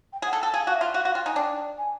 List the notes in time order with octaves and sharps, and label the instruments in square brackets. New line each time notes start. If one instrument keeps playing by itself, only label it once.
[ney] G5
[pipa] G#4
[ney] F#5
[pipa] A4
[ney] G5
[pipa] A4
[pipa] G#4 [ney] F5
[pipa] F#4 [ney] F5
[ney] E5
[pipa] F4
[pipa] F#4 [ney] F5
[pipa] F#4 [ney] F5
[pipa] F4 [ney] G5
[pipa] D#4 [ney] G#5
[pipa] D4 [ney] G5
[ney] G#5